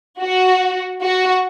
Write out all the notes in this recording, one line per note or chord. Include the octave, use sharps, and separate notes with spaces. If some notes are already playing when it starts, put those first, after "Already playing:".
F#4
F#4